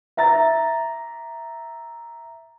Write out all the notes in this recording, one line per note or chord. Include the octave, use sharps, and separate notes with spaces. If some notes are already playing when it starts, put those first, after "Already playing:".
E5 A#5 A6